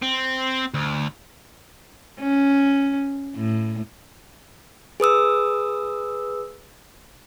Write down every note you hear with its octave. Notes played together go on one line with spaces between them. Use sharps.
C4
D2
C#4
A2
G#4 B4 D#6 E6